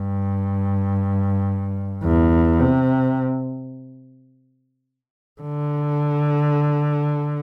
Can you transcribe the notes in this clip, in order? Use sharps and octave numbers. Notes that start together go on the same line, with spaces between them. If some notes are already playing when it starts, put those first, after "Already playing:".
Already playing: G2
E2
C3
D3